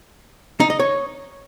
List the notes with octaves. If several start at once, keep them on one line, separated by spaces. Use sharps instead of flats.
D#4
D#5
C#5